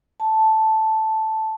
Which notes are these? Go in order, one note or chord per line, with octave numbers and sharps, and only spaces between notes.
A5